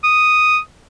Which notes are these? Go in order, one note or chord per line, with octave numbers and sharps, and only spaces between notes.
D#6